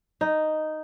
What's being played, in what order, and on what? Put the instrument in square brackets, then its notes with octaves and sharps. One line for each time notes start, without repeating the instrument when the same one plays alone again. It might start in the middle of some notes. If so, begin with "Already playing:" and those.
[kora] D#4